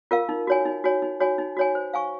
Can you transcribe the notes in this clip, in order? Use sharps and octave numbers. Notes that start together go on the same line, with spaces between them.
F4 A#4 F5
D#4
F#4 C#5 G#5
D#4
F#4 C#5 G#5
D#4
F#4 C#5 G#5
D#4
F#4 C#5 G#5
C5
F5 G#5 C#6